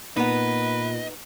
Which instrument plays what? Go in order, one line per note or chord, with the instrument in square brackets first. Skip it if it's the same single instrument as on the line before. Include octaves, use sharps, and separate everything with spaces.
[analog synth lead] A#2 [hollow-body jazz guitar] B3 D#4 [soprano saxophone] B4 [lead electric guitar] D#5